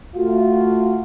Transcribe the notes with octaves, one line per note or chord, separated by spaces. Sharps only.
A3 F4 F#4